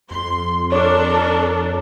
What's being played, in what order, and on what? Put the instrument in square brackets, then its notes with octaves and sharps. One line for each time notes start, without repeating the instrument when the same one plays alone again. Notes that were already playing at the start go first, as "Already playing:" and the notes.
[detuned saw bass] F2 [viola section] C6
[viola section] D4 A4 A#4 [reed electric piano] C#5 D6